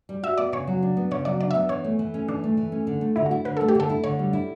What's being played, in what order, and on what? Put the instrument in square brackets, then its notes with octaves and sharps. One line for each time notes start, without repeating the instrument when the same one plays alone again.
[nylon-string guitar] G3
[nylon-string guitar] F#4 [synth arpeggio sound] E5
[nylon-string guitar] B3 [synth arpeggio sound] D5
[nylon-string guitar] C#3 [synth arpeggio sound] C#5
[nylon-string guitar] F#3
D4
B3
[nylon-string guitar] C#3 [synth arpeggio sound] C#5
[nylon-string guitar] F#3 [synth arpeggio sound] D5
[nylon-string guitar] D4 [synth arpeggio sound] D5
[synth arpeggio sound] E5
[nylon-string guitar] B3
[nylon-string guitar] E3 [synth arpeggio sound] C#5
[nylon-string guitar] A3
E3
C#4
[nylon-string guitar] E3 [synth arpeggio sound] D4
[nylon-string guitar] A3
E3
C#4
D3
A3
[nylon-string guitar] D3 [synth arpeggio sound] E4
[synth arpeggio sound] F#4
[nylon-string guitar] E4
[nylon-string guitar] D3 [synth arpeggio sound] B4
[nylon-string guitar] A3 [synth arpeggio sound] A4
[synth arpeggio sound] G4
[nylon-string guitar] D3 [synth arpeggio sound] A4
[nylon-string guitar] E4
[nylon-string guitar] D3 [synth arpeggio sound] C#5
[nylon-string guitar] G3
E4